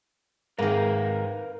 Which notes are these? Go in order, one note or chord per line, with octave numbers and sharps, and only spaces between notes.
G#2 D#3 A#4 B4 F5